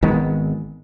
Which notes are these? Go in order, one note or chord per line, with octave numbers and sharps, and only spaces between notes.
G#1 D#3 G#3 B3